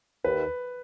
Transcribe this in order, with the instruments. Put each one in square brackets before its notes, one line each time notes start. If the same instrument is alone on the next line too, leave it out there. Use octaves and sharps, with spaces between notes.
[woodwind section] D#2 [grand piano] B4